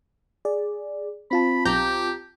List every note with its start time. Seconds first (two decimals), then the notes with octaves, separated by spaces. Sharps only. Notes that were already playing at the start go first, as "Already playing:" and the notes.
0.45 G#4 D5
1.31 C4 F4 A5 B5
1.65 B1 G4 A#5 G6